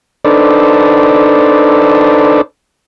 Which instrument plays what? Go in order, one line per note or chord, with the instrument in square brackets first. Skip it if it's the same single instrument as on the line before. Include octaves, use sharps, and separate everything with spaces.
[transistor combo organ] D4 D#4 A4 B4 C5 D5